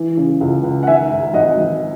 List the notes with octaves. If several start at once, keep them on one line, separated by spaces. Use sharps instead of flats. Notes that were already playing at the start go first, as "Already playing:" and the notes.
Already playing: E3
C#3
C#2
C#2
F#5
D#3 E5 G#5
G#2
G#1 D#5 F#5
G#1